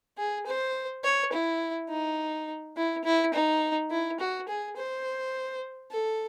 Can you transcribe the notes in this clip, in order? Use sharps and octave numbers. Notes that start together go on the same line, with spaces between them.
G#4
C5
C#5
E4
D#4
E4
E4
D#4
E4
F#4
G#4
C5
A4